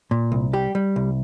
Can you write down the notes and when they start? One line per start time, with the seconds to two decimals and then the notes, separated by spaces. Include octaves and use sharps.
0.11 A#2
0.32 C2
0.53 G3 G4
0.75 G3
0.96 C2